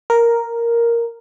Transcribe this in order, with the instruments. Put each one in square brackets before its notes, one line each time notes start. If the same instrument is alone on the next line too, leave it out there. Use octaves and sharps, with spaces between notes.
[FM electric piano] A#4